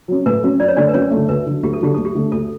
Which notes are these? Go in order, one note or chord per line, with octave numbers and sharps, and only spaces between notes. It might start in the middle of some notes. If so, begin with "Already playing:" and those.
F#3 C#4
A2 B4
F#3 C#4
F#2 D5
C#5
D3 A3 D4 D5
B4
F#2 C#4 C#5
A3
D3
D2 B4
D3 F#3
D2 G4
A4
D3 F#3 G4
D2 A4
G4
D3 A3
D2 A4